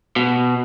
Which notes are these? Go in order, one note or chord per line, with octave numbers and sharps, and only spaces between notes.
B2